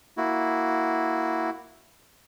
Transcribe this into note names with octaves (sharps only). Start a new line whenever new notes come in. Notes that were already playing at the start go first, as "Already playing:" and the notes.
A#3 E4 F#4